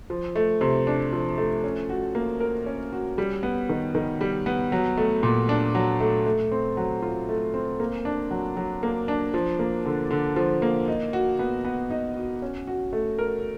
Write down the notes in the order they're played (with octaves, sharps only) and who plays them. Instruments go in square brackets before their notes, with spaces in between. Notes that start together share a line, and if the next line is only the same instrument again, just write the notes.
[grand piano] F3
A3
C3
D4
F3
A3
C#4
F#4
A#3
A#4
C#4
F#4
G3
B3
D#3
D#3
G3
B3
F#3
A3
A#2
D4
F#3
A3
A3
C4
F#3
F4
A3
C4
A#3
D4
F#3
F#3
A#3
D4
F3
A#3
D3
D3
F3
A#3
D#4
F#4
B3
B3
D#4
F#4
C#4
F#4
A3
A#4